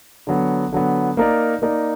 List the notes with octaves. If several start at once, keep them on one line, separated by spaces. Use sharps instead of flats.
D3 F#3 B3
D3 F#3 B3
A#3 D#4 A#4 D5
A#3 D#4 A#4 D5